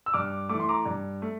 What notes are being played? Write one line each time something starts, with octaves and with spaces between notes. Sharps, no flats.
E6
G2 D6 F6
A3 D6
E3
C6
A#5 D6
G2
A3